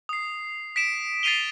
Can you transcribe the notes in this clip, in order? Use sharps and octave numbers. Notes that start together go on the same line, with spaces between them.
D#6 C7
B6 D7 E7
A6 B6 C7 D#7 F7 G7